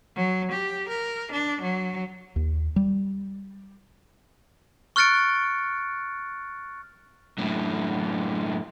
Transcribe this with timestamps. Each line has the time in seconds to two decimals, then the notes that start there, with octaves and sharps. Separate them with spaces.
0.16 F#3
0.51 G4
0.89 A#4
1.32 D4
1.62 F#3
2.36 D#2
2.76 G3
4.96 C#6 F6 F#6 A6 C#7 D7
7.38 F#2 A2